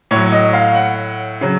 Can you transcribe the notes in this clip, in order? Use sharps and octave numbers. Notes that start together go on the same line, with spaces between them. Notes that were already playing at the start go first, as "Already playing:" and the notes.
A2 F#3 C#5
D#5
F5
F#5
C#3 F#3